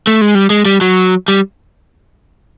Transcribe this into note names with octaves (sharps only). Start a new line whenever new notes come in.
A3
G#3
G3
G#3
G3
F#3
G3